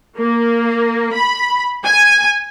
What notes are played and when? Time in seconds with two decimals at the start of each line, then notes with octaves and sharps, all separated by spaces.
0.18 A#3
1.15 B5
1.85 G#5